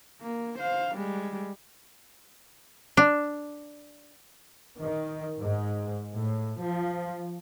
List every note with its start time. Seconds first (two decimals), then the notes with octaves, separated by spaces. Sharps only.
0.21 A#3
0.59 C5 F5
0.95 G3 G#3
2.97 D4
4.80 D#3
5.38 G#2
6.12 A2
6.57 F3